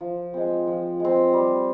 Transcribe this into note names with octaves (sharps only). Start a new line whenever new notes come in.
F3
G#3 C4
F3
G#3 C4
G3